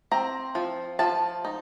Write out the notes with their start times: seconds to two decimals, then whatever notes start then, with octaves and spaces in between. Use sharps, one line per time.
0.11 C4 A#5
0.55 F3
0.99 F3 A5
1.45 D#4